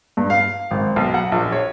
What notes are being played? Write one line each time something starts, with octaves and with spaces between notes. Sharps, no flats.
G2
F5
G#1
B1
F#5
A#1
C#5